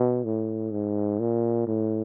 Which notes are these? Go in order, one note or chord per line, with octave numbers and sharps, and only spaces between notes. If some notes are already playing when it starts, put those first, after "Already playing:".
Already playing: B2
A2
G#2
A#2
A2